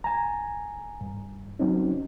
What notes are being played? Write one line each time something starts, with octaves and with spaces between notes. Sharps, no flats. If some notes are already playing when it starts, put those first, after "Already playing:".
G#5 A#5
G2
F#3 C4 C#4 D#4